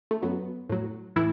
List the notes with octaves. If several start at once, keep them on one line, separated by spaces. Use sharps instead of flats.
A3
F#2 F#3 B3
A2 F#3
A2 E3 E4